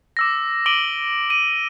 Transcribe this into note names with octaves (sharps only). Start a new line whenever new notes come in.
D6 E6 A#6
D6 D7 D#7 F#7 G7
D#7